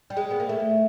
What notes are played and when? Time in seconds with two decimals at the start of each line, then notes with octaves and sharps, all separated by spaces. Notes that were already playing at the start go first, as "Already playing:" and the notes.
0.10 G3
0.17 G#3
0.31 B3
0.40 A#3
0.49 A3